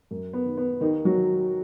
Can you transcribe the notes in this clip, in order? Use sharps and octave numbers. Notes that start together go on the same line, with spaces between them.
F#2
B3
D#3
B3
D#2 D#3 D#4
F#3 F#4
D#3